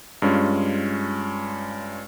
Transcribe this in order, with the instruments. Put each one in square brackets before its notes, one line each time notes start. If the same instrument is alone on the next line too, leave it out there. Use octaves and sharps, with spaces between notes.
[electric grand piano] G2 G#3 C#4 F4